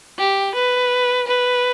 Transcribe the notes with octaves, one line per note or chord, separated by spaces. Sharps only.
G4
B4
B4